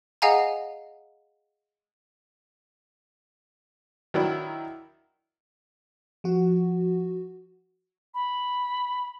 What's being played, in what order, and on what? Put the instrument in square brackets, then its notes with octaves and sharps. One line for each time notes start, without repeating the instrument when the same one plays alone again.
[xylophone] G#4 D#5 F5 F#5 G#5 A#5
[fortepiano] D#3 F#3 D4 E4
[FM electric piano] F3 F#4
[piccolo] B5